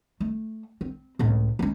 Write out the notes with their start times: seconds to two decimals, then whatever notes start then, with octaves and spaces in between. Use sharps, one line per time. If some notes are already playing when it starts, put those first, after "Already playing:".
0.20 A3
0.81 C4
1.19 C#2 A2
1.59 G#3 C#4